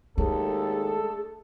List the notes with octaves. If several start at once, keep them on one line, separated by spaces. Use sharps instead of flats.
D#2 G#3 A3 D4 G#4 A4